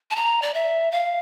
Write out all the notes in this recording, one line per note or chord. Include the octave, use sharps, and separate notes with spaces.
A5
A#5
D5
E5
F5